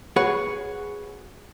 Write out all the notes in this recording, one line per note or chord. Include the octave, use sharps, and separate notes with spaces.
F#4 G#4 B4 C#5 F#5